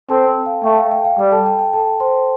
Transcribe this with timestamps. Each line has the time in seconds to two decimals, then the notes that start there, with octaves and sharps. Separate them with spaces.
0.10 C4 A4 A5
0.27 G5
0.46 F5
0.63 A3 G5
0.78 F5
0.91 G5
1.04 F5
1.19 G3 G5
1.32 A4 A5
1.46 G5
1.59 G5
1.73 A4 A5
2.00 C5 C6